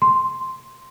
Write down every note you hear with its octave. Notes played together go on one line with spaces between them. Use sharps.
C6